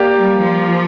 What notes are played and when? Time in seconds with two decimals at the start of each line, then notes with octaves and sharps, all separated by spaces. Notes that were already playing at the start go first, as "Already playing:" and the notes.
Already playing: A#3 G4 D5 F5
0.13 G3
0.41 F3